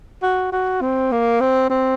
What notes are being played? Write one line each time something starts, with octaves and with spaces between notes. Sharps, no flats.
F#4
F#4
C4
A#3
C4
C4